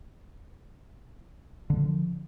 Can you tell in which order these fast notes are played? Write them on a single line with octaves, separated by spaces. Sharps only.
D3 G3 F3